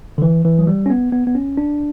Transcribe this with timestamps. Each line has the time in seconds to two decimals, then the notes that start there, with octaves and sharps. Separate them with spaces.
0.18 D3
0.22 E3
0.45 E3
0.59 F#3
0.67 G3
0.86 C#4
0.90 B3
1.12 B3
1.27 B3
1.35 C#4
1.57 D4